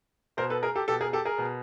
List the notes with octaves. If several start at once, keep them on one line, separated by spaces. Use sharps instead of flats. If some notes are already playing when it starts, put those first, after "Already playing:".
B2 A#4 C5
A4 B4
G#4 A#4
G4 A4
B2 G4 A4
G#4 A#4
G4 A4
G#4 A#4
B2